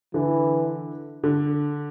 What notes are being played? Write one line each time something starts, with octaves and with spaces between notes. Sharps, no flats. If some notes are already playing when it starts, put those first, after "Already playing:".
D3 E3
D3